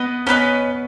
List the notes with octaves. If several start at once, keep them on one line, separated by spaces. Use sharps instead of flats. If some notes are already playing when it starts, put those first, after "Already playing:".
Already playing: B3 B4 D#5
B3 C#4 E4 B4 D#5